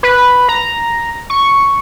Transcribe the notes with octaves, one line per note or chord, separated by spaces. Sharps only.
B4
A#5
C#6